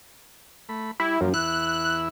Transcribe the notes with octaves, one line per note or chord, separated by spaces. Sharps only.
A3 B5
G3 E4
F#2 F3 A#3
E2 E4 E6 F#6